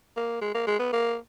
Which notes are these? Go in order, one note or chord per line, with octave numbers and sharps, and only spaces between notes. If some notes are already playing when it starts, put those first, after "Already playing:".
A#3
G#3
A#3
G#3
B3
A#3